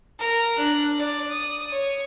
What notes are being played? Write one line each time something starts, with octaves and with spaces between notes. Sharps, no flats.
A#4
D4 F#6
D5
D#6
C#5